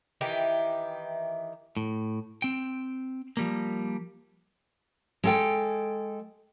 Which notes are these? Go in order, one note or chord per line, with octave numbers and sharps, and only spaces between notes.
D#3 E3 G4
A2
C4 G5
F3 G3 A#3
G#3 A4 G5